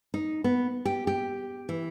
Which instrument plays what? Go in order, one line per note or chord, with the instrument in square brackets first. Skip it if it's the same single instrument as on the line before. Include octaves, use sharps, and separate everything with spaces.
[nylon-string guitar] D#4
B3
G4
G4
E3